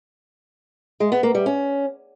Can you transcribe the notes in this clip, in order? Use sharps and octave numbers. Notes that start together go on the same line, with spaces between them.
G#3
B3
A#3
G3
C#4